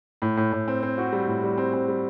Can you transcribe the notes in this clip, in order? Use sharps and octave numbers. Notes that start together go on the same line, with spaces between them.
A2
A2
A2
C4
C4
F#4
G3
A2
G3
C4
C4
G3